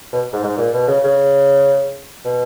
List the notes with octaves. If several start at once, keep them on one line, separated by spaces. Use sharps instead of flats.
B2
G#2
G#2
A#2
B2
C#3
C#3
B2